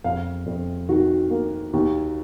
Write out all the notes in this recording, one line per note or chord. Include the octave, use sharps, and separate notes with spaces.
F2 F5
F2
D#3 F#4
A#3
D#2